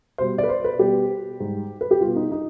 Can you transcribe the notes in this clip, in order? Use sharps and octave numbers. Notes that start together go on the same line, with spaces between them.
B2 G3 C5
D5
B4
C5
B4
B2 G3 G4
G#2 G3
B4
G4
B2 G3 F4
D#4
D#4